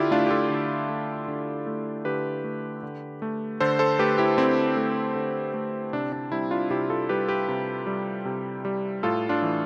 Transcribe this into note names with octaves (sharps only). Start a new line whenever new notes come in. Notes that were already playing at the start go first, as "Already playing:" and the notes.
Already playing: D3 D4 E4 F4 G4
A3 D4 F4
G4
F4 A4
D3
A3
D3
A3
D3 G4 B4
A3
D3
A3
D3 A4 C5
A4 C5
A3 G4 B4
E4 G4
D3 C4 E4
A3
D3
A3
C3 D4
D4
G3 C4 E4
D4 F4
C3 E4 G4
F4 A4
G3 G4 B4
G4 B4
C3
G3
C3
G3
A2 F4 A4
D4 F4
E3 A3